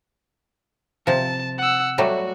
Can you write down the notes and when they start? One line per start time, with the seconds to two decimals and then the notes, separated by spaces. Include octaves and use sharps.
1.07 C3 F3 A5
1.58 F#5 E6
1.98 F#3 G3 A3 F#4